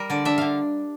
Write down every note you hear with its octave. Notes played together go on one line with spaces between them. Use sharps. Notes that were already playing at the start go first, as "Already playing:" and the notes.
Already playing: G3 A#4
D3 D5
D4 E5
D3 F5